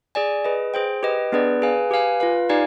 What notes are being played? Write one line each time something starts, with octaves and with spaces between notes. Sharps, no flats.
G#4 D5 G#5
G#4 B4 D#5
G#4 C5 G5
G4 B4 D#5 G5
B3 D4 G#4 B4 D5
G#4 B4 F5 G#5
G4 B4 F5 G#5
F4 B4 F5
D#4 G4 D5 F5 G#5